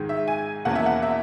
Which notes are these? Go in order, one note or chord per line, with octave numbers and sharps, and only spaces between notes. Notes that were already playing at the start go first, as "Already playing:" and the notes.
Already playing: G#2 D#3 G#3
E5
G#5
E2 B2 A#3 C#4 F#5
E5
F#5
E5